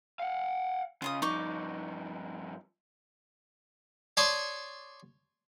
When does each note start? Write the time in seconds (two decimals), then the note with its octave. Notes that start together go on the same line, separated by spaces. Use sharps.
0.19 F5 F#5
1.02 C#3 F4 D#5 D#6
1.22 G2 F3 D#4 C#6 D6
4.17 C#5 D5 A5 C6 C#6 D#6